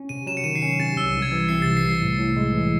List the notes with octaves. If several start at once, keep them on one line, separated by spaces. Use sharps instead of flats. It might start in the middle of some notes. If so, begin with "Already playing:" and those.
Already playing: C#4
C3 D#7
F#3 E7
C#7
D#3 D#7
C7
C#4 C#7
C3 A6
C2 E6
C2
G#6
E3
C3 C7
C2 A6
C7
C2
A2
A2
G#3
E3